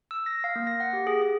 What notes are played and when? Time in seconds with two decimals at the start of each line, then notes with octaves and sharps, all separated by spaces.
0.11 E6
0.26 A#6
0.44 F5
0.56 A#3
0.67 A#6
0.80 F#5
0.93 G4
1.07 G#4
1.22 G#4